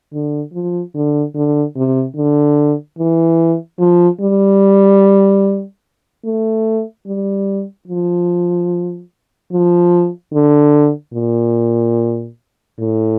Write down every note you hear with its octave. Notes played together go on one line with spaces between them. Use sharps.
D3
F3
D3
D3
C3
D3
E3
F3
G3
A3
G3
F3
F3
D3
A#2
A2